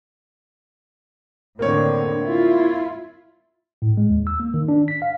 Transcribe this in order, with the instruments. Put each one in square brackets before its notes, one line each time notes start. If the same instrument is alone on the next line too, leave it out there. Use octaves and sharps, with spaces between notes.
[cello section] A2 D3 [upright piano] A#3 C4 C#5
[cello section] E4 F4
[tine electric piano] A2
G#3
D#2
E6
A#3
D#3
D4
B6
F5